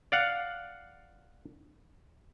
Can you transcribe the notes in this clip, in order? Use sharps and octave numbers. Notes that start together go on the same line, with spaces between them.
D5 F5 F#5